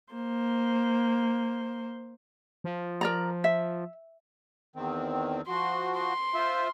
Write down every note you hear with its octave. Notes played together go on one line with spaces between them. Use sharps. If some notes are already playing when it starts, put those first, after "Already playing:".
A#3 C5
F3
A#4 D5 A#5
E5
E2 D#3 C4
F3 F#4 C6
C6
F4 C5 E5